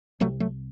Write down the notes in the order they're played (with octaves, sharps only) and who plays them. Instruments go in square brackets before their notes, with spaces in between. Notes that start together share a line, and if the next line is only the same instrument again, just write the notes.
[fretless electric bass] C2 C3 F#3 A3
F#3 A3